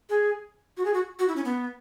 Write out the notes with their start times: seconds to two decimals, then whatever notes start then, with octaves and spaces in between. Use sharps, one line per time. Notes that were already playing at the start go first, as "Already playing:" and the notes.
0.10 G#4
0.77 F#4
0.85 G#4
0.94 F#4
1.19 F#4
1.28 E4
1.36 C#4
1.45 B3